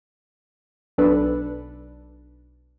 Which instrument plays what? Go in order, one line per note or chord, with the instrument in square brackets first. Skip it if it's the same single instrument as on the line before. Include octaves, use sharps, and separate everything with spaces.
[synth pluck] B1 D4 A4 B4